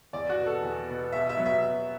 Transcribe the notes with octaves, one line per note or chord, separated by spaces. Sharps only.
E2 D5
F#4
B2 B3
A4
E2
B2 B3
B2 E5
E5
F#3 B3
E5
B2